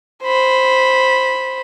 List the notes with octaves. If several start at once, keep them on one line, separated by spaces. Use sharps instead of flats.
C5 B5